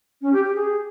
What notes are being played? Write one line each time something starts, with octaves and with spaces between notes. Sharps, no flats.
C#4
G4
G4
G#4